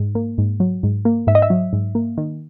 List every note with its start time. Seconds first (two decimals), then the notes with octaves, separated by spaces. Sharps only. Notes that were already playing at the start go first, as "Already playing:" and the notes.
Already playing: G#2
0.15 A#3
0.38 G#2
0.60 F#3
0.83 G#2
1.05 A#3
1.27 G#2 E5
1.35 D#5
1.42 E5
1.50 F#3
1.73 G#2
1.95 A#3
2.18 D#3